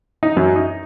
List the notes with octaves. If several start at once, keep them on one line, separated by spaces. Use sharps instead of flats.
D#4
F#2
D#4